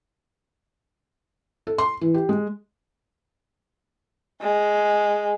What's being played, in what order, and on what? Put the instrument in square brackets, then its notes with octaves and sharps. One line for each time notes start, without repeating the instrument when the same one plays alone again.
[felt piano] A4
C6
E3
G4
G#3
[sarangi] G#3